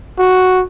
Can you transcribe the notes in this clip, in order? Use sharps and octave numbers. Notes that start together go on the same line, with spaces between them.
F#4